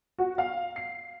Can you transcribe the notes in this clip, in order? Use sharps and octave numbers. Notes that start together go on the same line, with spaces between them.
F#4
F5
C7